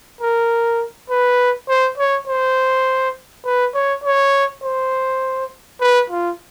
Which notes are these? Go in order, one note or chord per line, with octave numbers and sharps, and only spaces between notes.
A#4
B4
C5
C#5
C5
B4
C#5
C#5
C5
B4
F4